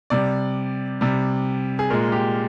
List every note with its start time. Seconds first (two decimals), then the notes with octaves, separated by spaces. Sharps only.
0.10 C3 G3 D5
1.01 C3 G3
1.79 G#4
1.90 A#2 G#3 A#4
2.12 G4